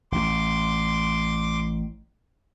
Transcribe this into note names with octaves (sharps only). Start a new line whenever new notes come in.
A1 C6 D6